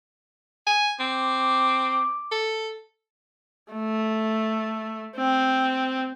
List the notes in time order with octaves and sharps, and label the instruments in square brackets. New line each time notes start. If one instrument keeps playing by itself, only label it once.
[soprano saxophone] G#5
[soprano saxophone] C4 [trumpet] D6
[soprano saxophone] A4
[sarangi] A3
C4